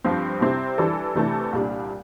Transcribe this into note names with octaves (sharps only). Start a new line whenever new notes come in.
G2 F3 C4
C3 G3 C4 E4
E3 G3 D4 A4
C3 E3 A3 D4 A4
C2 A#2 G3 D4